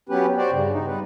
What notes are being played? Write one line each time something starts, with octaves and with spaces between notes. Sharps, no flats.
F#3 B3 C#4 G4 B4
F#4 G4 C5 D5
G2 C#3
D#4
G3 B3 B4